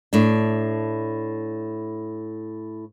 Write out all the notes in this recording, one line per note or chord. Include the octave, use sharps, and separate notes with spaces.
A2 D4